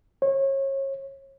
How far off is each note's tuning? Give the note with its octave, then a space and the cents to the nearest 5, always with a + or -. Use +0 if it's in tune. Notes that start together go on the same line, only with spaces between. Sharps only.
C#5 -30